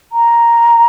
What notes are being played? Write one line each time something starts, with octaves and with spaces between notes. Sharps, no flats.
A#5